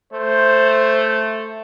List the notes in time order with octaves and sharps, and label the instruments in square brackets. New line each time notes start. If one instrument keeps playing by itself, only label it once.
[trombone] A3 [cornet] C5